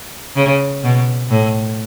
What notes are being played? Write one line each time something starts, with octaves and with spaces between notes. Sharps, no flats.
C#3
B2
A2